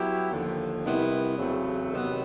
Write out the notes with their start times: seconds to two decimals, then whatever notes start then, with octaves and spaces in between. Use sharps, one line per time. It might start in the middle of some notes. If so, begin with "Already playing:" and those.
Already playing: F#3 B3 E4 G4
0.31 D#2 D3 F3
0.85 C3 D#3 G3 B3 E4
1.38 E2 C#3 F#3 A3 C4
1.93 C3 D#3 F#3 B3